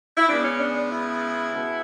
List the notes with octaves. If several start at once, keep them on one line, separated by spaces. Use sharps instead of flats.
E4
C#3 G#3 B3 D4
C#4
D4
D4
E4
B2 G#3 B3